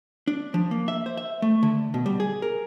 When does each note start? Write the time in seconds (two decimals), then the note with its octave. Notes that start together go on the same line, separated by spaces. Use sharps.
0.28 D4
0.54 F3
0.71 A#3
0.88 E5
1.06 C5
1.17 E5
1.42 A3
1.63 D3
1.94 B2
2.06 G3
2.20 G#4
2.42 A#4